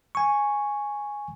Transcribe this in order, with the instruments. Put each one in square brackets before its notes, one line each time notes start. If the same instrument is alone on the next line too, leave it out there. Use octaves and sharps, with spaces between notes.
[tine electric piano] G#5 C#6